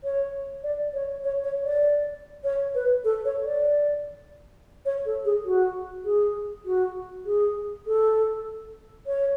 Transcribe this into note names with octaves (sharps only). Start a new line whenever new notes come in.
C#5
D5
C#5
C#5
C#5
D5
C#5
B4
A4
C#5
D5
C#5
A4
G#4
F#4
G#4
F#4
G#4
A4
C#5